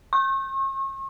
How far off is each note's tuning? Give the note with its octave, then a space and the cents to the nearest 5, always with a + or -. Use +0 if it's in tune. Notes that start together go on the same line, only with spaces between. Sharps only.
C#6 -40